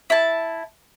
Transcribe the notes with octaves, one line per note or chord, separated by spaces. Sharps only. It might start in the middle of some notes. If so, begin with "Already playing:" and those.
E4 A5